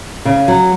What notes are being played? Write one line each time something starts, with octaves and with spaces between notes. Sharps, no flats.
C#3
F#3